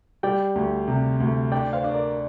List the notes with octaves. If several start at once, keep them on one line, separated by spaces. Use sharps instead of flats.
G3 D5 G5
D2
C3
D2
D4 D5 G5
C5 F5
D4
A#4 D5